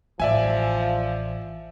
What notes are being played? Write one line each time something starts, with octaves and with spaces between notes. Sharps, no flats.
A1 F3 D5 E5 G#5